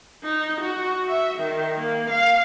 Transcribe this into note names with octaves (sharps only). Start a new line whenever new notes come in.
D#4
F#4
E5
D#3
A#3
F5